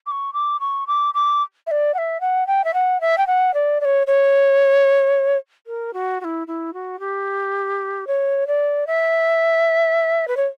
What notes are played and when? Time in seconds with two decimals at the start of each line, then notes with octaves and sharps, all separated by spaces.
0.06 D6
0.11 C#6
0.34 D6
0.60 C#6
0.87 D6
1.14 D6
1.67 E5
1.71 D5
1.94 F#5
1.98 E5
2.21 F#5
2.47 G5
2.64 E5
2.74 F#5
3.01 E5
3.18 G5
3.27 F#5
3.54 D5
3.81 D5
3.85 C#5
4.07 C#5
5.67 A#4
5.94 F#4
6.21 F#4
6.24 E4
6.47 E4
6.74 F#4
7.00 G4
8.07 C#5
8.47 D5
8.87 E5
10.28 B4
10.37 C#5